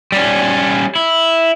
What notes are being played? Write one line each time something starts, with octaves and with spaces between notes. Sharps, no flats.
G3 C#4
E4